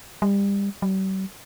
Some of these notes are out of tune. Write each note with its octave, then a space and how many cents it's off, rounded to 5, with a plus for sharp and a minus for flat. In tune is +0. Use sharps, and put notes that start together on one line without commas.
G3 +30
G3 -45